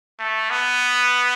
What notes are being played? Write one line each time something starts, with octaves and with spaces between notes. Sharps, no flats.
A3
B3